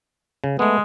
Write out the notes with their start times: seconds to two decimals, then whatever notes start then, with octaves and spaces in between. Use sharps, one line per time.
0.44 C#3
0.59 G#3 A3 B3